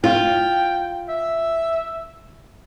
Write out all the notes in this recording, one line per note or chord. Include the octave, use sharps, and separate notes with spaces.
F4 G5
E5